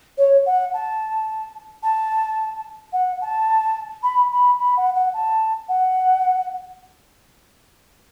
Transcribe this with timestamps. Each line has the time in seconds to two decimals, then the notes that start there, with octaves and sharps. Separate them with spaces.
0.18 C#5
0.46 F#5
0.74 A5
1.83 A5
2.93 F#5
3.21 A5
4.03 B5
4.32 B5
4.59 B5
4.77 F#5
4.95 F#5
5.14 A5
5.69 F#5